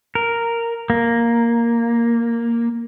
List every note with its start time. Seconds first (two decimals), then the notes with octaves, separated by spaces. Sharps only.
0.15 A#4
0.90 A#3